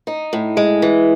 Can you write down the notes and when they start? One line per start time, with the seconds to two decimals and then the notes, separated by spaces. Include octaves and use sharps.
0.07 D#4
0.33 A2
0.57 G#3
0.82 E3